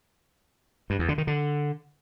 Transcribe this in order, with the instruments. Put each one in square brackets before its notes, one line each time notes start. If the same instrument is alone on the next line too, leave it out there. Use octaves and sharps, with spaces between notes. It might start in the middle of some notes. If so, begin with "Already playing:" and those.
[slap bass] G2
E2
D3
D#3
D3